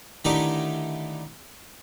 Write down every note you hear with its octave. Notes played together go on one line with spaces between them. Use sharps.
D3 D#3 A3 D#4 E4 G4